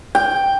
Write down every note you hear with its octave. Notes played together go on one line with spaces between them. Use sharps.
G5